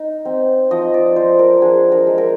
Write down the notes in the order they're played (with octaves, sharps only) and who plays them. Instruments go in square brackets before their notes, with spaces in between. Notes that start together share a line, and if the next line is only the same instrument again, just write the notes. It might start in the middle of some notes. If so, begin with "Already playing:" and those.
Already playing: [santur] D#4
C4
F3 D#5
D5
F3 C5
A#4
D4 G#4
A#4
G#3
A#4